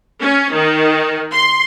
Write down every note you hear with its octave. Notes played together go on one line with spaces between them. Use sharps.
C#4
D#3
C6